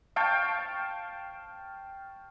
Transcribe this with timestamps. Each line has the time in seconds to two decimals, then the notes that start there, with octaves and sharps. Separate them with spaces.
0.16 F5 G5 A5 C#6